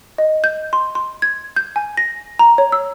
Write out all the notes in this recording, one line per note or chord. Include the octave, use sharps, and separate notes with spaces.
D#5
G6
C6
C6
G#6
G6
G#5
A#6
A#5
C#5
E6